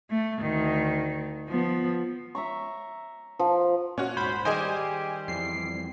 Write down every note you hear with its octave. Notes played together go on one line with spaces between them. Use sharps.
A3
D2 D#3
F3 B3
E5 A#5 C#6
F3
A#2 C#4 F#4
D#1 G#2 C5 B5
D#3 G3 G4 G#4 C5 D#5 G#5
F2 E3 C7